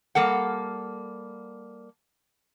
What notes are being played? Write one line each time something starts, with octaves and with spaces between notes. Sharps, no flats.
G3 A#3 A4 F#5